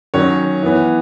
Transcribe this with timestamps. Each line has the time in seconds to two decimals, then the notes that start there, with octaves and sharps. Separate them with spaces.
0.14 D#3 F#3 C#4 C#5
0.63 E3 B3